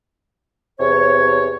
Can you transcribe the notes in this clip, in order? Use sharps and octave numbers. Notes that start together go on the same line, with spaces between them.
E2 C3 C#5